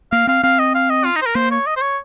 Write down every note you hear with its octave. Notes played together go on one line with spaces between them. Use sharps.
A#3 F5
C4 F5
C4 F5
D#5
F5
D#5
F4
D#4
C5
A#4
A#3 C5
C#5
D#5
C5
C#5